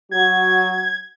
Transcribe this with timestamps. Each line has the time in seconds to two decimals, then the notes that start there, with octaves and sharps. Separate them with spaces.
0.11 F#3 F#4 G#6